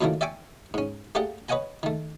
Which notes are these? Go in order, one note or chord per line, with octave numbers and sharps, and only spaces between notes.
F#2 A#2 D#3 E3 A3 A#3
D5 E5 G5 G#5 C#6 D6
G#2 C#4
A3 A#3 G4 G#4 D5 F#5
B4 C#5 D#5 F#5 G#5 A#5
D#3 A3